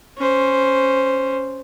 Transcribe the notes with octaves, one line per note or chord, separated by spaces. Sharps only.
C#4 C5